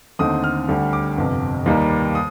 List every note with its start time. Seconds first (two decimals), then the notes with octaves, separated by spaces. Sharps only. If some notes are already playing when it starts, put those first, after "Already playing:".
0.19 D#2 D3 A3 C4 D#4 D#6
0.44 F6
0.68 D2 D3 G3
0.93 D6
1.18 G1 F2 C3
1.66 D#2 D#3 G3 A#3 D#4
2.15 D#6